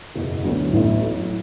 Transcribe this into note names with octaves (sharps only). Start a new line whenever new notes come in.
F#1 E2 B2
D2 D3 F#3 B3
A1 A2 E3 A3 E4
A2 F#3 A3